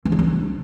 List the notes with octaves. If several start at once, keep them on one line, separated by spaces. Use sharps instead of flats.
E3
E4
D4